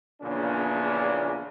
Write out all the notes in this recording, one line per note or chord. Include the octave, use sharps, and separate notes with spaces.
A#1 E2 A#2 C#3 C#4 D4